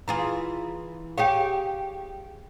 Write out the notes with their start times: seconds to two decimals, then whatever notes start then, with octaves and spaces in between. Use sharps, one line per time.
0.08 E3 F4 G#4 A#5
1.18 G4 G#4 C#5 F5 G5